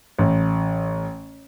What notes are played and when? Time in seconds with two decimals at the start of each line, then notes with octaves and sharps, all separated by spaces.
0.18 A1